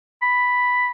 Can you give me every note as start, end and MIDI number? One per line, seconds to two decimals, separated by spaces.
0.22 0.91 83